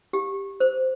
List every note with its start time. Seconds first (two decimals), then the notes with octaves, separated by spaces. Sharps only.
0.13 G4
0.60 C5